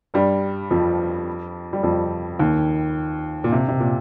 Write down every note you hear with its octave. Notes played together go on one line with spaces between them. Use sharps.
G2 G3
F2 F3
G3
F2 F3
D#2 D#3
A#2
C3
C3
A#2